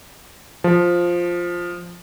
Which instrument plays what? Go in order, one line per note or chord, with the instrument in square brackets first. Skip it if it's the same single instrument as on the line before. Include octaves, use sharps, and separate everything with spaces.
[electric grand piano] F3